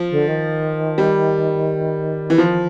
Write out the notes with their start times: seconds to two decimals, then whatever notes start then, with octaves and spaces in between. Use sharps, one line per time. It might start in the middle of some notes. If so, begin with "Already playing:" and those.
Already playing: F3
0.11 D3
0.28 D#3
0.98 G3
2.30 E3
2.38 F3